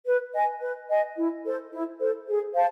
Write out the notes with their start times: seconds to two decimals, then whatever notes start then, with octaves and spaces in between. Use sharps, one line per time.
0.05 B4
0.33 D#5 G#5
0.60 B4
0.89 D#5 G#5
1.16 E4
1.43 A4 C5
1.71 E4
1.99 A4 C5
2.27 G#4
2.54 C5 F5 A5